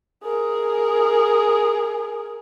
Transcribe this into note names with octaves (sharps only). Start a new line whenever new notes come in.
G#4 A#4